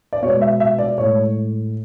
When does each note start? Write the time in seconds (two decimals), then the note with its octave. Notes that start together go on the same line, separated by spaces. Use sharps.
0.13 D5
0.22 B2 C#5
0.26 G#3
0.41 E5
0.60 E5
0.79 D5
0.98 A2 G#3 C#5